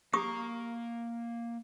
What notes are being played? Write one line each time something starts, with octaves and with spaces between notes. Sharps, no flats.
A#3 G4 A#5 C#6 D#6